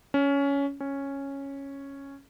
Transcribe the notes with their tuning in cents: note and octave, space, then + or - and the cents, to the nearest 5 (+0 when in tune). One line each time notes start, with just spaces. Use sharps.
C#4 +15
C#4 -5